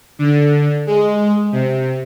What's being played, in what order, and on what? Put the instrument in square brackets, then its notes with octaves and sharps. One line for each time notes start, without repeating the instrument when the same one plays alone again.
[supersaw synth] D3
G#3
C3